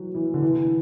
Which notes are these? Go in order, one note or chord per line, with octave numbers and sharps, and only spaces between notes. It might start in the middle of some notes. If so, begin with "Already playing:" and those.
Already playing: E3 F#3
E3
D3
E3